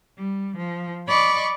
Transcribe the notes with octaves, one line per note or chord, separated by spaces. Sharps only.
G3
F3
D5 D#5 B5 C#6 D6